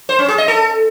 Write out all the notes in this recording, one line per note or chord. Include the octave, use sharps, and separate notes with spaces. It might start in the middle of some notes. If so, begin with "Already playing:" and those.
C5
C#4
G#4
D#5
A4